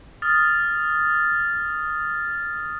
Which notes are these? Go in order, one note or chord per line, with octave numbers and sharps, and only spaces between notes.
D#6 F6 A6